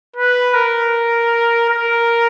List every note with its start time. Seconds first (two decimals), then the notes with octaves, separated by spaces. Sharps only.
0.16 B4
0.54 A#4
1.69 A#4